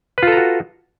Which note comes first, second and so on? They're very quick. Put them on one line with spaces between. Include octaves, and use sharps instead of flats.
B4 F4 A4 A#5 F#4